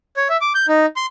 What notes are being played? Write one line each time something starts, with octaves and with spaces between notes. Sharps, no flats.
C#5
E5
D6
G6
D#4
C6